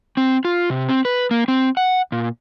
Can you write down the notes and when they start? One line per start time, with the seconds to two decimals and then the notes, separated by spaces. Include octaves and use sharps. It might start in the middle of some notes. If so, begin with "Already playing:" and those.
0.17 C4
0.45 F4
0.70 C3
0.89 C4
1.05 B4
1.31 A#3
1.48 C4
1.77 F#5
2.12 A#2